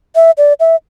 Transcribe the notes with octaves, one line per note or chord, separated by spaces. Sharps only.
E5
D5
E5